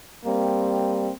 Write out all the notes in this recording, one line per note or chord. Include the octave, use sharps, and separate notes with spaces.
G3 A#3 C4